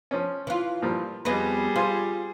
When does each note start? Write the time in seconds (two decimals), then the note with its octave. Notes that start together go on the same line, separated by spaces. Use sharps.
0.11 F3 C#4
0.47 E3 F4
0.82 A#2 F3 G3
1.25 F2 G3 B3 G#4 B4 D#5
1.76 F4 C5 G#5 C6